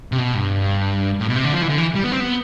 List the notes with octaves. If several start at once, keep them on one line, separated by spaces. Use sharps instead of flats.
C3
B2
G2
A2
B2
C3
D3
F3
E3
D3
E3
G3
B3
C4
B3